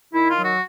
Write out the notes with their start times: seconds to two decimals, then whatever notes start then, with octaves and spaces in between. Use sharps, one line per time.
0.13 D#3 E4
0.29 F4
0.37 F#3
0.45 F#4